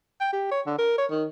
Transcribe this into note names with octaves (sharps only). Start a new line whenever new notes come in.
G5
G4
C#5
D3
A#4
C#5
D#3